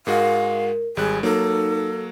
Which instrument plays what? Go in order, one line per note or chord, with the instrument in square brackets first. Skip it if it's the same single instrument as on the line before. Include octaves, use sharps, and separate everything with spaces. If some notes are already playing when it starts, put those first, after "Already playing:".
[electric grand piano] G#2 G#3 F#4 [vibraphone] A#4 [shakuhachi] F5
[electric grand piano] G#1 G3 F#6 [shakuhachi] G#4
[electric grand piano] F#3 A#3 [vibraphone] D#4 [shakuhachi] A4